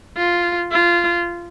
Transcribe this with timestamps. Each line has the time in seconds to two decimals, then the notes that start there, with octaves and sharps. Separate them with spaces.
0.17 F4
0.72 F4